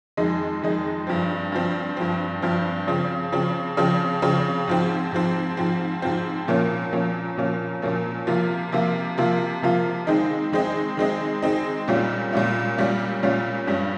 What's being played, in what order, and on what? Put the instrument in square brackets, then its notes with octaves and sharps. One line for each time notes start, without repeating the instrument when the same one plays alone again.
[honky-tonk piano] F2 D#3 G#3 D#4
F2 D#3 G#3 D#4
G2 F3 C4
G2 F3 C4
G2 F3 C4
G2 F3 C4
C#3 F3 C4
C#3 F3 C4
C#3 F3 C4
C#3 F3 C4
G#2 F3 C4
G#2 F3 C4
G#2 F3 C4
G#2 F3 C4
A#2 F3 A#3 C#4
A#2 F3 A#3 C#4
A#2 F3 A#3 C#4
A#2 F3 A#3 C#4
C3 F3 A#3 F4
C3 F3 A#3 F4
C3 F3 A#3 F4
C3 F3 A#3 F4
D#3 G#3 C4 D#4
D#3 G#3 C4 D#4
D#3 G#3 C4 D#4
D#3 G#3 C4 D#4
A#2 G3 C#4 F4
A#2 G3 C#4 F4
A#2 G3 C#4 F4
A#2 G3 C#4 F4
G2 G3 C#4